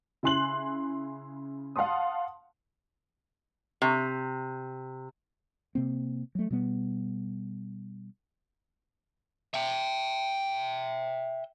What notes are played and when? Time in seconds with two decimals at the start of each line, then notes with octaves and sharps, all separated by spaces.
0.23 C#3 E4 G#5 C6 F#6 F#7
1.76 F5 F#5 A5 C6 D#6
3.82 C3
5.75 C3 A#3 C4
6.35 F#3 A3
6.50 B2 G3 B3
9.54 E5 G5